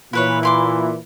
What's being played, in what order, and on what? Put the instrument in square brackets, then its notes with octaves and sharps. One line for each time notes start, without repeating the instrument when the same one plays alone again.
[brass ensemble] A#2 E3 [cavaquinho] E4 B4 C#5
[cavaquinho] E4 C6 D6